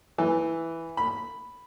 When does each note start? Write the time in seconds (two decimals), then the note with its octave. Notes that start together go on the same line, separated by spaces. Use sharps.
0.18 E3
0.97 B5